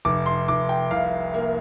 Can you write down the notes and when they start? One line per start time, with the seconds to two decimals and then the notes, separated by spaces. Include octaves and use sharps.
0.05 F1 D6
0.26 C6
0.48 F1 D6
0.69 G5
0.91 C2 F5
1.34 A#3